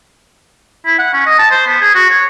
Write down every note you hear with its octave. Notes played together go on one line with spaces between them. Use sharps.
E4
F#5
C#4
D#5
A5
C5
B3
G#4
F#4
C#5